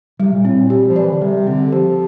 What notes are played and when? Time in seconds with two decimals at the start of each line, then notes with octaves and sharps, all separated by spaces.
0.20 C3 G3
0.33 A#2
0.45 A2 C4
0.59 A#2
0.70 G4
0.77 G3
0.88 F3
0.96 E3 D5
1.11 D3
1.21 C3 G3
1.47 D3 C4
1.72 F3 G4